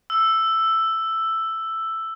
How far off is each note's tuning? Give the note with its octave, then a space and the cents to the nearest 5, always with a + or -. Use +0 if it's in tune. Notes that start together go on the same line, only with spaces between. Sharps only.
E6 +5